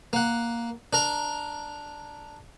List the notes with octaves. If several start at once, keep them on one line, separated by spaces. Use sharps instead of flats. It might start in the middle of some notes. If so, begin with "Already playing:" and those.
A#3 F#5
D4 A#4 A#5